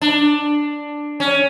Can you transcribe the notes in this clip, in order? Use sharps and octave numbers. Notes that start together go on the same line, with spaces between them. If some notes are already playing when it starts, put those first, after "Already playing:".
D4
C#4